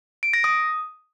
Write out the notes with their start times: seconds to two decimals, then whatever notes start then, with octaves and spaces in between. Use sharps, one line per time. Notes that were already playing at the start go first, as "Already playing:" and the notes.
0.23 D7
0.33 A#6
0.44 D#6